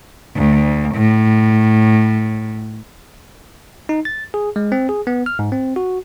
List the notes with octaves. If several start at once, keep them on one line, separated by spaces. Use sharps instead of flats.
D2
A2
D#4
A6
G#4
G#3
C4
G#4
B3
F6
G#2
C4
F#4